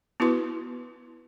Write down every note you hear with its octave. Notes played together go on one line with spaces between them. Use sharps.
B3 E4 F#4 B4 C6